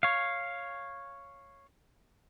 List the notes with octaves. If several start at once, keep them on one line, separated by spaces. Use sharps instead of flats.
C#5 F5